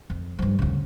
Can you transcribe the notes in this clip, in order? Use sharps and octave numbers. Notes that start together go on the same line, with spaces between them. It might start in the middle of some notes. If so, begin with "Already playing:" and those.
F2
G2 F3
D2 C#3